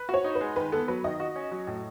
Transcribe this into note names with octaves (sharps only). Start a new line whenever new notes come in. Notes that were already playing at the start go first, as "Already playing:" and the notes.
Already playing: B4
F#4 C#5
D#4
B4
G#3
D#3 B4
B3 A4
F#3 B4
D#3 D#5
F#4
C#4
F#3
A2